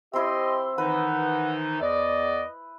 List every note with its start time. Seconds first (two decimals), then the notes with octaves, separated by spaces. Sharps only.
0.13 C4 E4 G4 D#5 C6
0.78 D#3 E3 D#4 B4 F#5
1.81 E2 D5 D#5